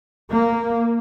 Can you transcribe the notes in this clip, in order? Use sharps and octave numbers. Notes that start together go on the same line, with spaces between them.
A#3